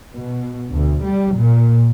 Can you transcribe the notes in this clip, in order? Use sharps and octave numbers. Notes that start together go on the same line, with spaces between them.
B2
D2
G3
A#2